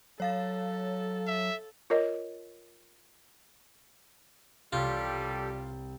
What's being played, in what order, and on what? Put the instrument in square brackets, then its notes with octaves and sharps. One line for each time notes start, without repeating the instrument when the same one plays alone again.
[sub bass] F#3 [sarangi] A4 [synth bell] C#5 F5 A6
[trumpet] E5
[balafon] F4 A#4 C#5 D#5
[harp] C2 C#5 [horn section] G3 [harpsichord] F4 [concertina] G4 A4